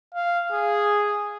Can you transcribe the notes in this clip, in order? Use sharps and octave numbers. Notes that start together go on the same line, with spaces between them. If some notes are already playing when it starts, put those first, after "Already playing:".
F5
G#4